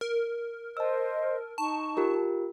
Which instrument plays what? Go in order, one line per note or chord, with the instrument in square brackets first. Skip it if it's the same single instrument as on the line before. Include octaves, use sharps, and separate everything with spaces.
[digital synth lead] A#4
[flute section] C5 D#5 [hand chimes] A5 E6
[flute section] D#4 C#6 [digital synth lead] A5
[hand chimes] F4 G4 A#4